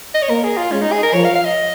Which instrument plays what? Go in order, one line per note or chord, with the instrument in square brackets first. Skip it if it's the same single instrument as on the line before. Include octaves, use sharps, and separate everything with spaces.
[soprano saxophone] D#5
C#5
[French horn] A#3 [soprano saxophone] A#4
[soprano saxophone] G#4
F4
[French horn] G#3 [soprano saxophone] C#4
[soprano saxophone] D#4
G#4
A#4
[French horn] F3 [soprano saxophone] C#5
[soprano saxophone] F5
F5
D#5